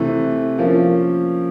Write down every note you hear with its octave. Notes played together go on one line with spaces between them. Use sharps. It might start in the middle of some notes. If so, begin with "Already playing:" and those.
Already playing: C3 E3 A3
F3 A#3 C#4